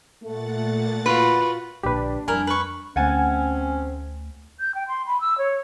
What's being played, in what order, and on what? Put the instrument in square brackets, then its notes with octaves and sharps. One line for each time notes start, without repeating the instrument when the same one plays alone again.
[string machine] A#2 F#5 A6 [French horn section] A3
[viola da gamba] F4 F#4 [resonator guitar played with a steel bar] B4
[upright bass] A#1 D3 [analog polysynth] D4 [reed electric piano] G4 B4
[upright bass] F2 G3 [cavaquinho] E4 A#4 [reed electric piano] G#5
[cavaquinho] B4 C#6
[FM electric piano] D2 A3 [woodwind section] C4 C#4 [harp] F#5 G#5 A5
[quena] G6
G5
C6
B5
E6
C#5